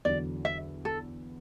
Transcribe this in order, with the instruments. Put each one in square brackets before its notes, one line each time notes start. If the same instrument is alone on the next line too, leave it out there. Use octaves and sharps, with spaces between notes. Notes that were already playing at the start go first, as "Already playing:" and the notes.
[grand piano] E2 D3 F#3 [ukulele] D5
[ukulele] E5
A4